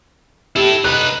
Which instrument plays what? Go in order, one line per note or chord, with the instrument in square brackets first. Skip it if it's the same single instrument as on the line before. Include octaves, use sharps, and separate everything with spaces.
[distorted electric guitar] E4 A4 [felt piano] G4
[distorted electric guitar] D#4 B4 [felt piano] F#6